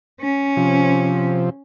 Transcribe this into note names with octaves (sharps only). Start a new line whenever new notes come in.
C#4
C3 F3